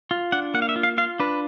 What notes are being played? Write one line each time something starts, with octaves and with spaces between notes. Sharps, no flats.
F4
D4 F#5
A#3 F#5
F5
E5
F4
F5
F4 F5
D4 B4